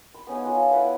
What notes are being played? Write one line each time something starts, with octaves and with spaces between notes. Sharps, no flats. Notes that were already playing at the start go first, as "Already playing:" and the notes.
B5 C6
B3 C#4 D#4 G#4
F4 A4 F5 F#5
A5
E4 B4 F#5 G#5